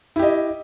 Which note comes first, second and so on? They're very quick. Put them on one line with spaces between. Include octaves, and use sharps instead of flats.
E4 G4 D#5